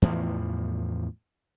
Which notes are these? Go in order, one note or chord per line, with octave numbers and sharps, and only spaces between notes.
E2 A2 E3 F3